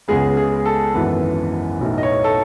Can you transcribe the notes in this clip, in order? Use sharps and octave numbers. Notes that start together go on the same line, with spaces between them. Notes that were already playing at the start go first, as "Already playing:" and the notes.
C#2 C#3 G#3 B3 G#4
G#4
A4
G#1 F#2 E3 B3
B1 A2 F#3 B3 D#4
D#5
C#5
A4